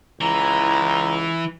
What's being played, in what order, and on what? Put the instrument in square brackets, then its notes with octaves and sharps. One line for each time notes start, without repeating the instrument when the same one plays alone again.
[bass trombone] C#2 [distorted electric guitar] E3 [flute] A#5